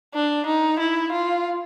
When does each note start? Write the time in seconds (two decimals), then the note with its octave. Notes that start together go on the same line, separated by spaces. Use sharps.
0.14 D4
0.46 D#4
0.79 E4
1.12 F4